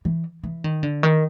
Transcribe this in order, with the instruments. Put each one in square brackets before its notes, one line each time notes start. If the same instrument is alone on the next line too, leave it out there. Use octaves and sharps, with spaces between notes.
[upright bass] E3
E3
D#3
D3
D#3